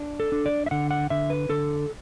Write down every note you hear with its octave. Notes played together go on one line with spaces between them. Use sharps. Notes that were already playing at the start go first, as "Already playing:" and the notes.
Already playing: D4
A4
D4
D5
E5
D3 F#5
F#5
D3 E5
B4
D3 A4